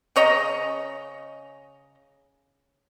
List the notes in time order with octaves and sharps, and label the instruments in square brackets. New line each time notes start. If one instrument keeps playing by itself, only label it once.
[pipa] C#3 C#5 D#5 A#5